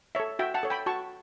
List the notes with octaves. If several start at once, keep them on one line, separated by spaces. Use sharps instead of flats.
A4 C#5 E5
F#4 E5 G5
F#5 A5
A4 C#5
G5 B5
F#4 A5 C#6